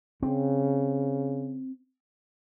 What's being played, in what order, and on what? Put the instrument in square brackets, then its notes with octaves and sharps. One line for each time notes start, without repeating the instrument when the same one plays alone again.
[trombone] C#3 [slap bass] C4